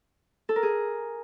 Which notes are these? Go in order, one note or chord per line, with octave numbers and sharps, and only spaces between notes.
A4
A#4
G#4